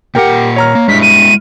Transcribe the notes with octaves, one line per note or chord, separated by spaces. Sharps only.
A#2 G4 A#4 F#5 G5
C#5 A#5 F6
A#3
G2 G#3 E4 B6
D#7